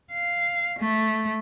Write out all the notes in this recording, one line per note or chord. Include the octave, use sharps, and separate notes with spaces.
F5
A3